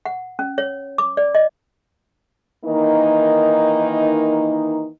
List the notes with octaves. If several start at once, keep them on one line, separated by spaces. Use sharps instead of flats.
F#5
C#4
C#5
D6
D5
D#5
D#3 E3 A#3 D#4